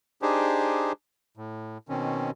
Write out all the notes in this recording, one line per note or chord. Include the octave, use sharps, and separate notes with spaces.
D4 D#4 G4 G#4 C5
A2
B2 D#3 C4 C#4